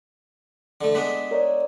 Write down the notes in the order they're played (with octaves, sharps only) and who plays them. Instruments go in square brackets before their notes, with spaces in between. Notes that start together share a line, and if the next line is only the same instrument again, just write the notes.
[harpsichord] D3 A3
[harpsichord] G#3 B3 D4 [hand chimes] B6
[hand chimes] A#4 C#5 D5